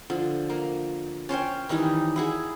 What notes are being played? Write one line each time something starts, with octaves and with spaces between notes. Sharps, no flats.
D3 F3
A#3
C#4 C5 C#5 G5
D#3 E3 G3 D#4
E4 F#4 G#4